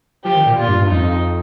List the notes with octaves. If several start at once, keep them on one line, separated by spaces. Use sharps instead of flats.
F3 G4
D#3
A#2
A#2 F4
G2
G2
F2 D#4